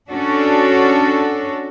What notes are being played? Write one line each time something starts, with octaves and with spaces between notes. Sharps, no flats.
C#4 D4 F#4 A4